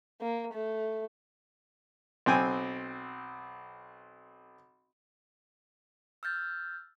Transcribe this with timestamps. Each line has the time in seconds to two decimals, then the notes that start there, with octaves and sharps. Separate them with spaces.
0.21 A#3
0.54 A3
2.26 B1 C4 G5 G#5
6.23 E6 F6 G6 A6